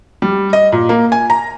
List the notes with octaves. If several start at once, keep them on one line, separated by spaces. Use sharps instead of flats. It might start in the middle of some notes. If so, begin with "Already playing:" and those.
G3
D#5
A#2
A#3
G#5
A#5